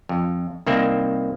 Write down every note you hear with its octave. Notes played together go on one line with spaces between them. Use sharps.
F2
C2 D#3 A#3 C4 E5